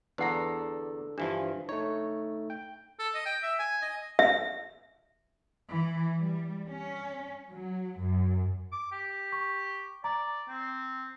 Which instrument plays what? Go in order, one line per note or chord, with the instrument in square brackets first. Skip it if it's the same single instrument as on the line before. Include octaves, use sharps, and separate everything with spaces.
[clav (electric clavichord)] E2 A#5 [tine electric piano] D4 A4 [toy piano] B4 F#5
[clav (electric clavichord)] G2 E3 F3 [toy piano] D4
[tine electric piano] A3 D#4 [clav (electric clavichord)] C#5
[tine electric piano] G5
[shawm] A4
D#5
G5
E5
G#5
D#5
[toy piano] E5
[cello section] E3
G3
C#4
F#3
F#2
[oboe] D6
G4
[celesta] C#6
[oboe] D5 [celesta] A#5
[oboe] C4